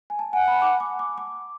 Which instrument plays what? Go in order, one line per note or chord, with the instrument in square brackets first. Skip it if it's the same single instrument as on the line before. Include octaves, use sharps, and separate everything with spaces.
[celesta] G#5
A5
[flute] F#5 [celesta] G#5
[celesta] B5
D6
D6
D6
D6